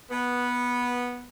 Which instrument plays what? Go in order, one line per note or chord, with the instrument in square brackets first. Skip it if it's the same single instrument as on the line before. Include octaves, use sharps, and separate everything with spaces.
[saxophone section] B3